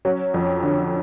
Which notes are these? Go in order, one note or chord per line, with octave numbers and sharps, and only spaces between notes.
F#3 C#4
F2
D3